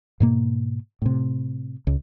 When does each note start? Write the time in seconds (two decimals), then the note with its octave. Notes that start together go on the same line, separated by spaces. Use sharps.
0.20 G#2 B2 A#3
1.02 A2 C3
1.87 C#2